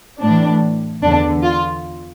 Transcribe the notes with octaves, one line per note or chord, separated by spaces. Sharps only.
A2 E3 D4
E2 D3 D4
F4